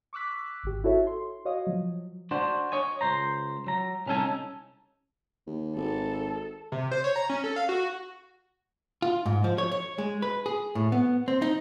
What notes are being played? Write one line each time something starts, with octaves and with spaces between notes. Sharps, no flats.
C#6 D6 E6 F#6 B6
G#1 G4
E4 F#4 A4 C#5 E5
C6
F#4 C#5 D#5 F5 D#6
F3 F#3
D4 F#4 C5
C#5 D#5 G#5
C#2 C5 A#5
F#3 A#5
C2 C#4 D#4 A4 G#5
D#2
G#1 A4
C3
C5
C#5
A#5
C#4
A4
F5
F#4
F4
G#2
F3
C#5
C#5
G#3
B4
G#4
A2
B3
C4
D#4